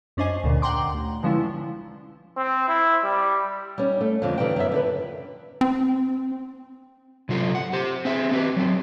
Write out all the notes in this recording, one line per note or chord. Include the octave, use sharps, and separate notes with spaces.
F#2 C#4 D4 C5 D#5 G#5
D2 A#2 D3
F#5 G5 A#5 C6 D6
A1
B2 D3 F3 G#3 C#4 E4
C4
E4
G3
G3 C#4 D#4
A3
F2 D3 G#3 C4
C#3 E3 G3 D#4 G5
F#2 B3 E5
D3 E4 B4
C4
C3 F#3 F4 F#4 A4
F#5
G4 C5
C4 G#4 E5
C4 G4 B4
F#3 C4